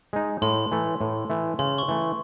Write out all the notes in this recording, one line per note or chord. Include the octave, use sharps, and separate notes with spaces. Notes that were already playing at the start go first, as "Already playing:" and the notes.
G#3 D#4
A2 C6
E3 A3
A2
E3 A3
C#3 C6
C#6
E3 A3